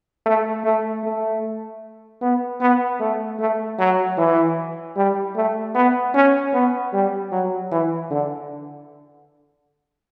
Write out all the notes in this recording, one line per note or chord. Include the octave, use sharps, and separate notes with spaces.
A3
A3
A3
B3
B3
A3
A3
F#3
E3
G3
A3
B3
C#4
B3
G3
F#3
E3
D3